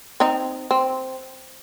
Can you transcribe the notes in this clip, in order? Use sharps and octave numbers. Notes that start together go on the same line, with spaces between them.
C4 D#4
C4